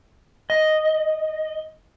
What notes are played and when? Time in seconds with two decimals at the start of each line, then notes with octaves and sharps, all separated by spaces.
0.50 D#5